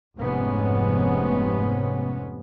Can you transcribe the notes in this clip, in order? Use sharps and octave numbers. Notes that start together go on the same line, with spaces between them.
F1 G#2 C3 B3 C#4